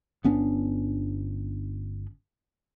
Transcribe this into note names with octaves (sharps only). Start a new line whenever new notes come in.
G1 B3 C#4 D4